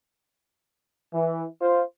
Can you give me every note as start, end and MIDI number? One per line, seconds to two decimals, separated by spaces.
1.14 1.45 52
1.61 1.82 65
1.61 1.82 72